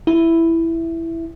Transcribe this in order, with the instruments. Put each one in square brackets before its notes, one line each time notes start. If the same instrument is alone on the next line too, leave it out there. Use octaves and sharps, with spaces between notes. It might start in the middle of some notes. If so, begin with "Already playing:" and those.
[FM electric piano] E4